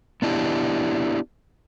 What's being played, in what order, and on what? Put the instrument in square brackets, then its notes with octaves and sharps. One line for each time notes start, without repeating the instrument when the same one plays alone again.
[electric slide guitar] B3 D4 E4 F4 G4